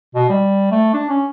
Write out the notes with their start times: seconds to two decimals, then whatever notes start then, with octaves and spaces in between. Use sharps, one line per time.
0.15 B2
0.30 G3
0.71 A3
0.94 D4
1.09 C#4